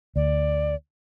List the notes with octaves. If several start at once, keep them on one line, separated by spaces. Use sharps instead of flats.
D2 D5